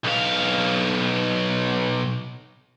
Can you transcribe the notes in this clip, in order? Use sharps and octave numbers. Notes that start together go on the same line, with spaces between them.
B1 F5